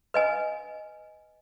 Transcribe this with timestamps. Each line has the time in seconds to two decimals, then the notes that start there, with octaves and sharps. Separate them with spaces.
0.14 B4 D#5 G#5